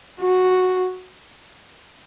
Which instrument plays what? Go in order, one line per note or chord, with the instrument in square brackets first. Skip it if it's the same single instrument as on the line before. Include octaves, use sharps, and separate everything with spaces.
[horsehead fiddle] F#4